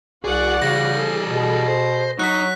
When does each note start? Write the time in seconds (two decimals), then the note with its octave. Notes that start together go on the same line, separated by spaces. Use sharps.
0.24 C2 F#4 G#4 D5 F#5
0.62 C#3 E3 G3 A#6
0.93 G#4 A4
1.25 B2
1.68 C5
2.19 F#3 D#4 F#6 B6